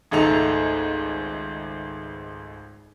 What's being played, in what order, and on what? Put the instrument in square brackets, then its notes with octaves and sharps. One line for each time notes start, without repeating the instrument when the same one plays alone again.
[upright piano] G#1 C#2 A3 D#4 A4 F7